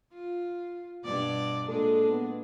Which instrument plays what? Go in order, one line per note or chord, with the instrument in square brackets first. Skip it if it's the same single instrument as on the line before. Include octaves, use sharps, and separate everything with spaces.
[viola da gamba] F4
G2 B2 D5
[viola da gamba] A#2 G#3 D4 [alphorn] A4
[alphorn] B3